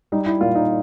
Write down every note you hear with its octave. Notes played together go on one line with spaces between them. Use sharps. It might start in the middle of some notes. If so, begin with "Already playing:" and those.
G3 D#4
E4
A#2 F4
D#4